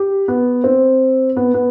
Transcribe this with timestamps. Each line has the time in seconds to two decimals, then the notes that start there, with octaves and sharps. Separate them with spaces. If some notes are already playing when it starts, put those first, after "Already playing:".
Already playing: G4
0.28 B3
0.64 C4
1.37 B3
1.54 B3